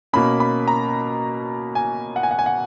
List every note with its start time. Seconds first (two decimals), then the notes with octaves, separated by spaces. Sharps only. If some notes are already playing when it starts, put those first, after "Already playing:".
0.13 B2 A#3 C#4 B5
0.40 B5
0.68 A#5
1.75 G#5
2.16 F#5
2.23 G#5
2.31 F#5
2.39 G#5
2.46 F#5